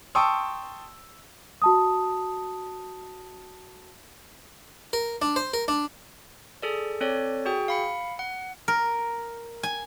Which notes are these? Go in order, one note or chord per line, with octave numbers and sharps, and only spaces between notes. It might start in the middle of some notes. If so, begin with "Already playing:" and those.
G5 A5 C6 C#6 D#6 E6
F#4 A5 D#6
A#4
D4
C5
A#4
D4
G#4 A4 D5
C4 A4 C#5 D5
F#4 G#4 G5
F5 B5 C#7
F#5
A#4
G#5